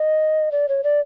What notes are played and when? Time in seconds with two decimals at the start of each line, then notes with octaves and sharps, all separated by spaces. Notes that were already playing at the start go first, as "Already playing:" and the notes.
Already playing: D#5
0.52 D5
0.68 C#5
0.84 D5